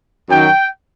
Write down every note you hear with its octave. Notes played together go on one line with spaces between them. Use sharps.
F#2 D#3 F#3 G5